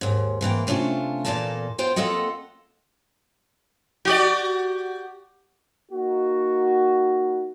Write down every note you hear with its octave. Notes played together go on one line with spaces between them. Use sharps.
D#2 G#2
G#2 E3 A#3 G5
C3 A3 C#4 D4 F4
E2 G2 A#2 A#3 A4 A5
B3 F4 C5 G5
A#3 C4 F4 A4 D#5 F#5
F#4 G4 D5
A#3 D#4 F#4